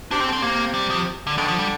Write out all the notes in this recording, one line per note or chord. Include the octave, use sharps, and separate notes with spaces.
C3 D4
C4
D3
C4
C3 A#3
G3
F3
D3
D3 D#3
F3
G3